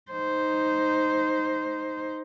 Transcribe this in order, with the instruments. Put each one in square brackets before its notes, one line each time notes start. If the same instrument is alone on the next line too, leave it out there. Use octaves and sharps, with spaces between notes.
[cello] D#4 C5